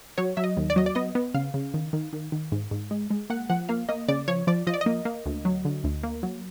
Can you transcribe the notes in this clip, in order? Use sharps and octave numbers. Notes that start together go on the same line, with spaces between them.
F#3 C#5
F#3 E5
D#5
D#2
D5
F#3 D#5
D5
B3 D#5
B3
C#3 F5
C#3
D#3
D#3
D#3
D#3
G#2
G#2
G#3
G#3
A#3 F#5
F3 F#5
A#3 F5
A#3 D#5
C#3 D5
F3 C#5
F3 D5
F3 D#5
D5
D#5
A#3
A#3
D2
F#3
D3
D2
A#3
F#3